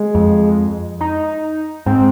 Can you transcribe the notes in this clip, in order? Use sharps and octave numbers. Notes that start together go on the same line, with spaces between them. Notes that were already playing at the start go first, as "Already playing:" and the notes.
Already playing: G#3
F2
D#4
G#2 C4